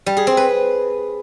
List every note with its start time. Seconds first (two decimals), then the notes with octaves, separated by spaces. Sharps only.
0.06 G3
0.17 G#4
0.27 C4
0.37 B4